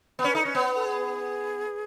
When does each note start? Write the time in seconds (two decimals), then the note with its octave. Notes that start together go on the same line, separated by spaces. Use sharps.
0.19 B3
0.24 C#4 B4
0.34 D#4 A4
0.44 C#4 B4
0.55 B3 C#5
0.75 A4
0.85 G#4